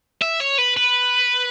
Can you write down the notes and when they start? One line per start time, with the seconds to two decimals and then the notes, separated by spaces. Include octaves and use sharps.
0.21 E5
0.40 C#5
0.58 B4
0.77 B4